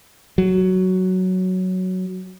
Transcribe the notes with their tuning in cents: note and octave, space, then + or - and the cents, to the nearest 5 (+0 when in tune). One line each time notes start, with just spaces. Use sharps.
F#3 +5